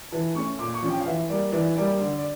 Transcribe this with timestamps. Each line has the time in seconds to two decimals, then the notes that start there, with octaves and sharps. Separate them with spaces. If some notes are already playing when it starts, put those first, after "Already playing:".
0.12 E3 A5
0.35 A3 C#4 C#6
0.59 A#2 D6
0.74 C#6
0.82 F3 C#4
0.90 G5
1.00 F5
1.06 E3 E5
1.29 G3 A#3 D5
1.52 E3 D5
1.76 G3 A#3 D5
1.99 D3 D5
2.18 D5